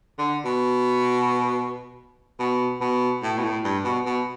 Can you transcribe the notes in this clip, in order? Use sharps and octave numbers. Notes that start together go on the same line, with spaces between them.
D3
B2
B2
B2
A2
B2
A2
G2
B2
B2